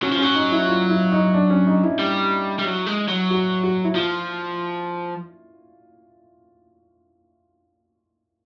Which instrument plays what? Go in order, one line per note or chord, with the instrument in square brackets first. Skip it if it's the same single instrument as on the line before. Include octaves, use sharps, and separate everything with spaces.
[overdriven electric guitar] F#3 [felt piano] C#4
[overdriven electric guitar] F3
[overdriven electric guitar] F#3 [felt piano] C#4
[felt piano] D#4
E4
F4
E4
D#4
D4
C#4
D#4
E4
[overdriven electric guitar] G3
G3
F#3
G#3
F#3
[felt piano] F#4
F#4
E4
[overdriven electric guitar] F3 [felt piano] F4